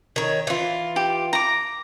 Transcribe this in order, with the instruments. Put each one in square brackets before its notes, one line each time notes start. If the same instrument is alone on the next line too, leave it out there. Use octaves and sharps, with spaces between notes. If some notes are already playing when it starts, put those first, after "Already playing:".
[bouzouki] D#3 C#5
E3 F4
[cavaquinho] G4
A#5 D6